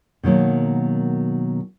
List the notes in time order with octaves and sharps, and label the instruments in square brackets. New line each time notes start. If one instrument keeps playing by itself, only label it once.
[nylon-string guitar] B2 D#3 F#3 A#3